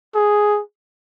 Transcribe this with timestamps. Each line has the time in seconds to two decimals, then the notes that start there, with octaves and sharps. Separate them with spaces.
0.15 G#4